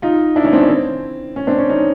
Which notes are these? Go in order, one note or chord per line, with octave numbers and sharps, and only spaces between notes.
D#4 F4
D4 E4
C#4 D#4
C4 D4
C#4
C4
C#4
C4 D4
C#4
C#4 D#4